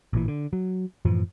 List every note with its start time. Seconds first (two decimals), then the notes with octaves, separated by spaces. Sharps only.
0.13 A1 A#2 E3
0.28 D3
0.53 F#3
1.05 F#2 A2 E3 F3